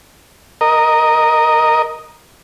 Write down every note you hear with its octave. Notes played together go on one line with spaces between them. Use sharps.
A#4 D#5